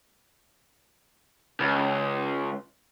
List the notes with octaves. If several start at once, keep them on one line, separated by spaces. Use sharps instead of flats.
C#2